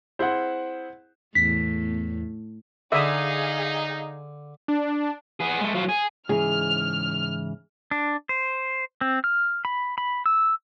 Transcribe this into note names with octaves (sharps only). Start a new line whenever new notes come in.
C4 E4 G#4 C5 F#5
E2 A2 B6
D3 D#4 G#4 E5 F5 D#6
D4
B3 G#4
G#3 A3
F#3 F4
G#4
G#2 C#3 E3 G#4 F6
D4
C5
C4
F6
B5
B5
E6